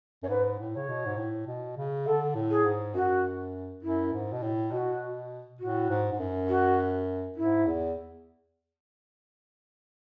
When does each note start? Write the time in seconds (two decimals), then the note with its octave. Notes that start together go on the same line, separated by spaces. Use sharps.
0.23 F#2 C#5
0.29 G#2 B4
0.59 A2
0.74 C#3 C#5
0.89 B2
1.06 G#2
1.18 A2
1.47 B2
1.77 C#3
2.06 D3 A4
2.35 A2
2.50 G#4
2.65 G#2
2.94 F#2 F#4
3.83 F#2 E4
4.13 G#2
4.32 B2
4.43 A2
4.72 B2 F#4
5.60 A2 F#4
5.90 G#2
6.12 G#2
6.19 F#2
6.49 F#4
7.37 G#2 E4
7.67 E2